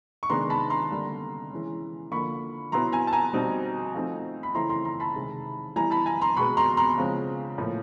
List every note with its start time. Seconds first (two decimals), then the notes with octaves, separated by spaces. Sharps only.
0.23 C#6
0.29 C3 D#3 G#3 B3 D4 A#5 C6
0.50 A5 B5
0.70 A#5 C6
0.91 D3 G3 A#3
1.51 E3 G#3 C#4
2.12 D3 F3 A#3 B5 C#6
2.72 B2 F#3 B3 E4 A#5 C6
2.92 G#5 A#5
3.07 A5
3.13 G#5 A#5
3.33 B2 G3 C4 D#4
3.94 F3 A3 C4 D#4
4.43 B5
4.54 C#3 E3 A3 C4 E4 A#5 C6
4.70 A#5 C6
4.85 A#5 C6
5.00 A5 B5
5.15 C3 D#3 G#3
5.76 E3 G3 B3 E4 G#5 A#5
5.91 A5 B5
6.06 G#5 A#5
6.21 A#5 C6
6.36 B2 G#3 B3 B5 C#6
6.57 A#5 C6
6.77 A#5 C6
6.97 C#3 F3 G#3 C4
7.58 A2 F3 A#3